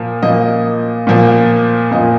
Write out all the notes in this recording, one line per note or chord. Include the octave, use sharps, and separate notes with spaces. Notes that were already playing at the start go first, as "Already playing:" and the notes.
Already playing: A#2 F3 A#3
A#2 F3 A#3 D#5
A#2 F3 A#3
A#2 F3 A#3 D#5